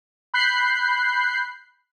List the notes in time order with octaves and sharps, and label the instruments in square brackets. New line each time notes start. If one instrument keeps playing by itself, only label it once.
[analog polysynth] B5 F#6 G6 C7